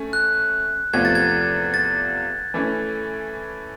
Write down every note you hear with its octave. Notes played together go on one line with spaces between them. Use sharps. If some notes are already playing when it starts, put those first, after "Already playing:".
Already playing: A3 C#4
F#6
E2 C3 F3 A3 G#6
A6
G#6
A6
E3 A3 C#4